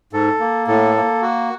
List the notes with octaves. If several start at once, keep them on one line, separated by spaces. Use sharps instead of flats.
G#2 A4
A#3
A2 A4
A#3
F#4